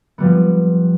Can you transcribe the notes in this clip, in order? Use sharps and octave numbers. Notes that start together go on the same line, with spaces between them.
F3 G3 B3